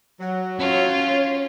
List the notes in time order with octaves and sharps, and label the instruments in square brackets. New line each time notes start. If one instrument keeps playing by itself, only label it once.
[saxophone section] F#3
[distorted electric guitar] C#4 [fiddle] F4 [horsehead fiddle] C#5